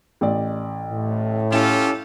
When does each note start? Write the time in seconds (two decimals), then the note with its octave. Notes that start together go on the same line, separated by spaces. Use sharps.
0.21 A1 D5
0.90 A2
1.52 C#4 E4 F4 G4 A4 G#5 E7